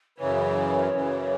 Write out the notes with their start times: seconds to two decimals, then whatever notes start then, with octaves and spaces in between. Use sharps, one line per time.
0.18 F#2 C#3 E3 C#5
0.92 F#2 C#3 E3